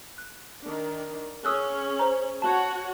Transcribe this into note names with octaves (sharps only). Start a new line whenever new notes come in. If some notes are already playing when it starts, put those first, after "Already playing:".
F#6
D#3 D4
C#4 G#4 C#5 D#6 E6 F#6
C5 A#5
F#4 C#5 F#5 A5